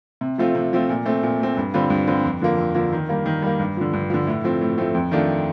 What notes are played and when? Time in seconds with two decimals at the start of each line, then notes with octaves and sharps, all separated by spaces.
0.21 C3
0.38 F3 A3 C4 F4
0.55 C3
0.73 F3 A3 C4 F4
0.89 A#2
1.06 A3 C4
1.23 A#2
1.40 A3 C4
1.57 G2
1.74 D3 G3 C4 F4
1.90 G2
2.07 D3 G3 C4 F4
2.24 F2
2.42 D3 F3 A#3
2.58 F2
2.74 D3 F3 A#3
2.93 D#3
3.09 G3 A#3
3.26 D#3
3.42 G3 A#3
3.59 G2
3.77 D3 F3
3.93 G2
4.10 D3 F3
4.27 A2
4.44 F3 A3 C4
4.61 A2
4.78 F3 A3 C4
4.95 F2
5.11 D#3 A3 D4 F4